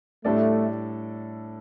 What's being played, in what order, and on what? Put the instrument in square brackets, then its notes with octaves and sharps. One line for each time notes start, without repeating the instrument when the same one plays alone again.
[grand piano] A2 G3 D4 A4 D5 [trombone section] A3